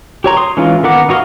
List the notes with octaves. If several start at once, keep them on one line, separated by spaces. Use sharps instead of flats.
G4 C#5 A#5 C6
C6 D#6
E3 G#3 C#4 D#4 F4
D#3 B3 A#4 F#5 D6
D#4 F#4 C#5 D#5 F5